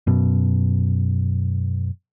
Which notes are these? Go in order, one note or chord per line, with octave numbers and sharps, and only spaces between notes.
F#2 B2